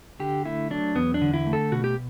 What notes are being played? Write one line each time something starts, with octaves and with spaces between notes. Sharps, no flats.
D3 G4
A3 E4
F#3 D4
E2 B3
D4
D3
E4
A3
A4
B2 F#4
G4